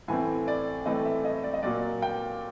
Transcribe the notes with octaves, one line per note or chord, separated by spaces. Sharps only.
A2 E3 A3 C4 G#5
D5
A2 E3 A3 C4 D#5
E5
D#5
D5
D#5
A#2 F#3 A#3 D5
G5